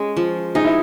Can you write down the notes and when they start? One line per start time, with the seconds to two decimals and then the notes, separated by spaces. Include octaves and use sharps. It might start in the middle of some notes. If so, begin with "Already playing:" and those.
Already playing: G#3 C#4
0.17 F3
0.55 D#4 G#4
0.65 E4